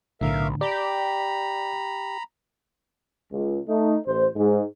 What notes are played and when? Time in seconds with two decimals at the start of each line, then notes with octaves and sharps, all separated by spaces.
0.21 B1 A2 D3 A#4 E5 F5
0.61 G4 D5 A#5 B5
3.31 C#2
3.67 A3 D#4
4.05 A1 C5
4.36 G#2